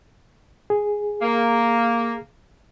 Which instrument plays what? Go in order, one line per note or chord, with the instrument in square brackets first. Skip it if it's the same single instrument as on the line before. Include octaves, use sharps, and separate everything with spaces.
[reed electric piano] G#4
[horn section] A#3